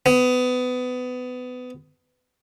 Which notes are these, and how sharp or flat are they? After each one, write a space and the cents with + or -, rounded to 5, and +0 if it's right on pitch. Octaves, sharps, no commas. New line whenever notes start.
B3 +25